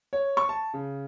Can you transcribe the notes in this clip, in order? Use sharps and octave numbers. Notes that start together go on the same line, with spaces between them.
C#5
C#6
A5
C#3